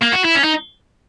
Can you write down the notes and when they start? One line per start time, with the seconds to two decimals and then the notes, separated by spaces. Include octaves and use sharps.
0.02 A#3
0.12 F#4
0.24 E4
0.35 C#4
0.43 D#4